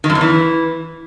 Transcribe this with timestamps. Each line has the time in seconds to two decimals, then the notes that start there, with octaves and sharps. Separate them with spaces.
0.04 D#3
0.10 F#2
0.15 E2
0.21 E3